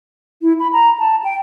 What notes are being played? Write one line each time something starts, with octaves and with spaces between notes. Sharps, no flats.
E4
B5
A#5
A5
G5